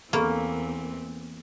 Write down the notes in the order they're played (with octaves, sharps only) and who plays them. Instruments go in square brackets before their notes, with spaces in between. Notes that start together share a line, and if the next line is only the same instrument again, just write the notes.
[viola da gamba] E2 E3 C4 [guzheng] A#3 [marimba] A4 B5 C#6